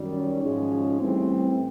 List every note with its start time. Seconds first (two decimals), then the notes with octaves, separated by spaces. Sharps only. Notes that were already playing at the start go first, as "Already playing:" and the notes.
Already playing: F#2 D#3 G3
0.14 C#4
0.42 G#2 F3 G#3
1.00 A2 E3 G3 C4